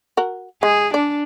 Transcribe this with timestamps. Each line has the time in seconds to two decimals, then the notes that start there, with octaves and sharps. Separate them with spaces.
0.17 F#4 A#4
0.63 G#3 G#4
0.94 D4 D5